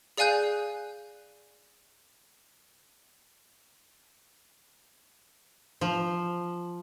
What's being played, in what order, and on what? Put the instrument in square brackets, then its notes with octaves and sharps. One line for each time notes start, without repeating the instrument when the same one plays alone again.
[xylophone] G#4 D5 F5 G#5 F#6 G6
[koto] F3